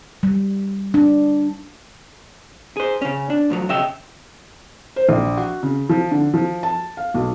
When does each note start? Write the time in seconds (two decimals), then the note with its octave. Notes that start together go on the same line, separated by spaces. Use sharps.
0.23 G3
0.94 D4
2.77 G#4 C5
3.02 C#3 C#4
3.30 D4
3.50 A2 F3 F#3
3.69 C#3 D#5 E5 G5
4.96 C5
5.09 A#1
5.37 F#4
5.63 C#3
5.89 F3
6.11 D3
6.34 F3
6.63 A5
6.97 F5
7.14 B1